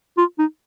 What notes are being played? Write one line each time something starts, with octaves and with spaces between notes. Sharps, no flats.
F4
D#4